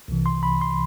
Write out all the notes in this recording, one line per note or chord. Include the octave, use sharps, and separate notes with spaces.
C2 C3 E3
C6
B5
C6